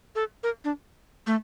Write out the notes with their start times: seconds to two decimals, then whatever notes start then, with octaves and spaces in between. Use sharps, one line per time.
0.15 A4
0.43 A#4
0.64 D4
1.27 A3